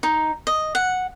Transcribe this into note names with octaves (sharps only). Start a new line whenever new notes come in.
D#4
D#5
F#5